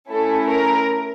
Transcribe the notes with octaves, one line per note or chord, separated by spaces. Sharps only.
A3 C#4 E4 A4
A#4